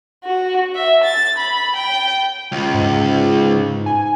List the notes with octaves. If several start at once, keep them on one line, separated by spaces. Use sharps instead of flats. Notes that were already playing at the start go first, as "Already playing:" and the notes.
F#4
E5
A6
B5
G5
C#2
G#2
G#5